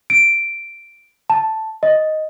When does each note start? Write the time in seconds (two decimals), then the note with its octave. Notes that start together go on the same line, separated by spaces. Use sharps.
0.10 D7
1.30 A5
1.83 D#5